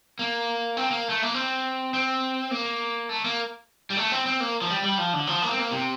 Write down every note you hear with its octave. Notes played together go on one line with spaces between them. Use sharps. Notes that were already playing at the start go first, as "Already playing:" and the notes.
A#3
C4
A#3
A3
A#3
C4
C4
A#3
A3
A#3
G3
A3
C4
C4
A#3
F3
G3
G3
F3
D3
F3
A#3
C4
A#3
C3